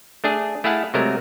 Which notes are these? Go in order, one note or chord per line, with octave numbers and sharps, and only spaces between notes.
A3 D4 G#4
A3 E4 G#4 F5 F#5 A5
C3 F#3 G#3 A3 A#4